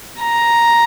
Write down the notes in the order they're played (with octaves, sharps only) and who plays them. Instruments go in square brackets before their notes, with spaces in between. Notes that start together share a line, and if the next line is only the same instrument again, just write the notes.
[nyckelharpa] A#5